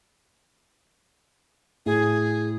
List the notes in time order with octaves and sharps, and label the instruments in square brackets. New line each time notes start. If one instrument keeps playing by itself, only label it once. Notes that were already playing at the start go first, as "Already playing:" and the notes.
[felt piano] A2 [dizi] G#4